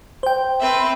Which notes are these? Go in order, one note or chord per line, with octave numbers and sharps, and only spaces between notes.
C5 G5
C4 B4 E5